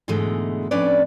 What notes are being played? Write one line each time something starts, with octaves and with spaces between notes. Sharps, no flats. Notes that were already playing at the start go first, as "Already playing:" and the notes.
G#2 B2 D3 E3 G#3 A3
F2 A2 C#4 D4 B4 D5